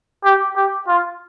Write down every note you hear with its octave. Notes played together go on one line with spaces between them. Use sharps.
G4
G4
F4